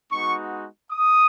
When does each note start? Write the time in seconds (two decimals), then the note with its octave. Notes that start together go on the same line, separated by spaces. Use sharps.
0.10 G#3 B3 D#4 F#4 C#6
0.90 D#6